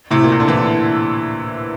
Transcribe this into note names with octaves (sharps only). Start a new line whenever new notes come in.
A2 C3
A#2
C3
D3
C3 E3